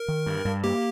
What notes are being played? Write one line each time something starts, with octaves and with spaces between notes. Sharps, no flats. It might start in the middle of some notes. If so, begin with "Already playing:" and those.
Already playing: A#4
D#3
G2
G2
A#3 G4